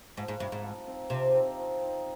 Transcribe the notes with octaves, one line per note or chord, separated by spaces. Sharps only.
G#2 F3
G#2
G2 C4 D#4
G#2
F3
C4 D#4
C3 F3
C4 D#4
F3
C4 D#4